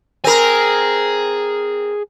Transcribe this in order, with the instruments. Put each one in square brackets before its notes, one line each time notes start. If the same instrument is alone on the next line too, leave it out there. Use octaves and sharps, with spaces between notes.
[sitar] C4 A#4 [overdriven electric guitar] G#4 G#5